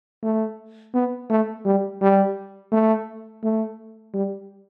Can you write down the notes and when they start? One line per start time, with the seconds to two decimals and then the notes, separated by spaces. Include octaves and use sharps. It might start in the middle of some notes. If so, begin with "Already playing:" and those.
0.23 A3
0.94 B3
1.30 A3
1.65 G3
2.01 G3
2.72 A3
3.43 A3
4.14 G3